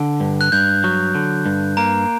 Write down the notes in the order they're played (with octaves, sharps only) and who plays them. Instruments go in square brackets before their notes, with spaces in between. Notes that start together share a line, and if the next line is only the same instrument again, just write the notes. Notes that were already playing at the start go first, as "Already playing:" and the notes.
Already playing: [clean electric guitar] D3
G2
[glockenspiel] F#6
[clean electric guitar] G2 [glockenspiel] G6
[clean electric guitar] F#3
D3
G2
[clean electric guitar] A#3 [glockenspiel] A#5